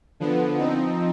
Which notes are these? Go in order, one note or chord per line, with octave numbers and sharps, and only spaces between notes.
D3 F3 B3
F3 C4 D#4